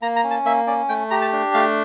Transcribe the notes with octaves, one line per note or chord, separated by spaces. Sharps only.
A#3 A#5
A#5
C#4
A5
A#3 E5
C#4 D5
A3 G5
G4 A#5
A5
D4
A3 F5